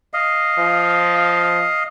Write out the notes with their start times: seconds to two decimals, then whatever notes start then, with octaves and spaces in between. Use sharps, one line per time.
0.14 D#5 F5
0.58 F3